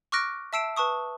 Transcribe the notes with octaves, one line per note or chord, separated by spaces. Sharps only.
C#6 D6 F6 F#6 A#6 D7
E5 A5 E6 C7 D7 E7
B4 A5 C#6 D#6